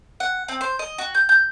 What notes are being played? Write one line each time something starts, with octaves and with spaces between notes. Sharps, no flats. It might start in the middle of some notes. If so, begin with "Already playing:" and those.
F#5
C4
C5
D#5
F#4
G6
G6